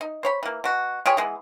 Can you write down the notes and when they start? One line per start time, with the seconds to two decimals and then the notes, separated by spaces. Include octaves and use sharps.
0.01 D#4
0.23 C5 C#5 B5
0.43 E3 A#3
0.64 B2 F#4
1.06 F4 G4 G#4 C#5
1.17 E3 G#3 B3